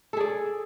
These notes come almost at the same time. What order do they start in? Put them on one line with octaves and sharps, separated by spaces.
A4 G#4 D5